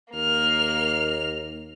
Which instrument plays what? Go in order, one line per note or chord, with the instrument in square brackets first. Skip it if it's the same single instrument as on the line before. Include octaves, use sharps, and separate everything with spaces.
[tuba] D#2 [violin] A#3 F6